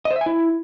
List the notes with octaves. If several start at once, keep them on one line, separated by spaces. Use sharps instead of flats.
D#5
C5
E5
G#5
E4